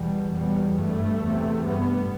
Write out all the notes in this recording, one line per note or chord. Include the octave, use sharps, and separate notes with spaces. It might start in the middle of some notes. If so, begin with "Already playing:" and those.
Already playing: E2 B2 G3
E2 B2 G3
G2 A3
E2 C3
G2 B3